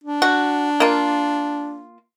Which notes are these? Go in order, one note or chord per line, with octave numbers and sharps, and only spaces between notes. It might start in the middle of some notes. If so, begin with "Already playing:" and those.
D4
F#4
A#3 F4